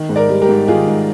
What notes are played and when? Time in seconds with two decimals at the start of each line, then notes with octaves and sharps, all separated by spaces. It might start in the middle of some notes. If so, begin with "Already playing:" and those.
Already playing: D#3
0.09 G#2
0.16 A#4 D5
0.29 G3
0.42 G4 A#4
0.49 G#2
0.68 D#3 F4 G#4
0.87 G#2